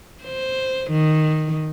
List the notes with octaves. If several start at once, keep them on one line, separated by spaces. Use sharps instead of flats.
C5
D#3